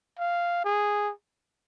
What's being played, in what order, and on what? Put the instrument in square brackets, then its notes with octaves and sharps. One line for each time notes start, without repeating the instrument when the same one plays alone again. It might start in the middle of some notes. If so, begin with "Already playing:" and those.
[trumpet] F5
G#4